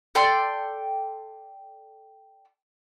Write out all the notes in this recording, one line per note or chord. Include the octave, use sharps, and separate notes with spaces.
A4 D5 G5 C6